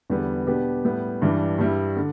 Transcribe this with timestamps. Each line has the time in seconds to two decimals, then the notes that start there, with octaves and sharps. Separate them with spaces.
0.10 E2 D3 G3 B3
0.47 B2 B3 D4 G4
0.85 A2 G3 B3
1.22 G2 E3 G3 D4
1.58 G2 G3 E4
1.96 D3